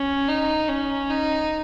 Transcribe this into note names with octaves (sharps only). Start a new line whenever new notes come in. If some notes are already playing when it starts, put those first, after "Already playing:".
Already playing: C#4
D#4
C#4
D#4